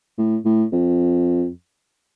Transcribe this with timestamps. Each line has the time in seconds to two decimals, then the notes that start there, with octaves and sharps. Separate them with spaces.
0.18 A2
0.45 A2
0.73 F2